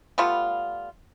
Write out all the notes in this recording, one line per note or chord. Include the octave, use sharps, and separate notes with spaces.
G3 A3 B3 F4